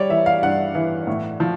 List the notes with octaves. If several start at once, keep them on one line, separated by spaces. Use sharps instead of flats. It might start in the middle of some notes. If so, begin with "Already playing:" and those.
Already playing: G3 C#5 D5
E3 E5
F5
G2 F#5
E3
A2
F3